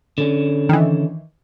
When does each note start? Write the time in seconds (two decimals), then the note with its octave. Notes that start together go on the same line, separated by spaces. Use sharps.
0.18 D3 C#4
0.69 D#3 E3